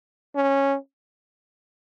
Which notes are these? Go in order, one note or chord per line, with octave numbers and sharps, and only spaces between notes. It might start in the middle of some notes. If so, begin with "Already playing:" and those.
C#4